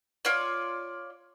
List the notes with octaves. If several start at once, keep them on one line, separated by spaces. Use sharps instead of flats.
F4 C#5 D5